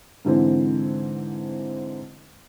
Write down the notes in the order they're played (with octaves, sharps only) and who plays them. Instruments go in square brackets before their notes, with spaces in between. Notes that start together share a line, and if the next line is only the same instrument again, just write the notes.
[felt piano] G#2 D3 E3 C4